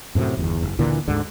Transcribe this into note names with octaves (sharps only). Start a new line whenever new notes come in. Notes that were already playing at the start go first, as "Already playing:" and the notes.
F#2 A2 C3 F#3
G1 E2
F#1
D2 A#2 D3 E3
D2 G#2 D3